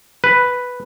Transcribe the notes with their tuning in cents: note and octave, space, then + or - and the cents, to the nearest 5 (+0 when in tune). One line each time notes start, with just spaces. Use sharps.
B4 +0